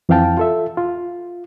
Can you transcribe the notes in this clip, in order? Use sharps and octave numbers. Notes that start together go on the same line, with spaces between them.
F2 E3 C4 F5 G5 A5
F4 A4 E5
F4